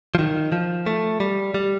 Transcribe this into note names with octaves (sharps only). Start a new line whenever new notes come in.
F3
D#3
F3
A3
G3
G3